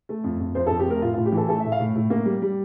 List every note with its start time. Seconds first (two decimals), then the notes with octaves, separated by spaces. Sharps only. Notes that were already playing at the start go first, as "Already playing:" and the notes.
0.09 A3
0.24 F2
0.40 F2
0.55 F2 C5
0.66 A4
0.70 F2
0.79 G4
0.86 A3 A#4
1.02 A2 F4
1.14 F4
1.17 A2
1.26 G4
1.32 E3 A4
1.48 A3 A4
1.60 E5
1.64 A2
1.72 F5
1.80 A2
1.95 A2
2.10 A#3
2.25 G3
2.42 G3